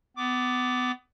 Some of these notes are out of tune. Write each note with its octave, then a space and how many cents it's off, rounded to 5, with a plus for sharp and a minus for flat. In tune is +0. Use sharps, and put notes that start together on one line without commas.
B3 +25 D6 +0